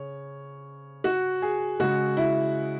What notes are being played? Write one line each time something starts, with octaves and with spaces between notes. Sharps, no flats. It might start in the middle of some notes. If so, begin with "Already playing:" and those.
Already playing: C#3 C#5
F#4
G#4
C#3 G#3 F#4
E4